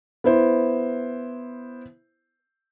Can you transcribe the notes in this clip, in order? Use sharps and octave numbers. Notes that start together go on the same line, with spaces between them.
B3 E4 C5